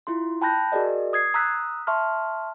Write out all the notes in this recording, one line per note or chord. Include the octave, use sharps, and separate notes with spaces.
E4 F4 C6
G5 A5 B5 F#6 G6 A#6
F#4 G#4 A#4 D5 D#5
D#6 G#6 C7
A#5 D#6 E6 F#6 B6
E5 A5 C6 C#6 F6